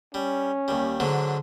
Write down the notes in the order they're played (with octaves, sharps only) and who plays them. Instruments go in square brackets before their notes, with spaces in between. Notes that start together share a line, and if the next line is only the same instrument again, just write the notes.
[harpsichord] G3 [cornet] C#4
[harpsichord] D#2 G3
G#2 D3 F#3